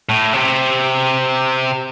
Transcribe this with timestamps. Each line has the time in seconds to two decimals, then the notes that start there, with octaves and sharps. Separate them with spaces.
0.09 A2
0.33 C3